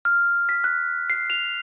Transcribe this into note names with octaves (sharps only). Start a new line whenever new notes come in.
F6
B6
F#6
C7
F7